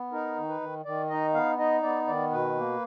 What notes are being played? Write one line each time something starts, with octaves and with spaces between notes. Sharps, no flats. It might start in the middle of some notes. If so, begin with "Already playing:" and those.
Already playing: B3
D#4 A#4
D#3
B4
D#3
D#3 D5
D#4 D#5
B3 F5
D#4 D#5
B3 D5
D#3 D5
B2 B4
A#3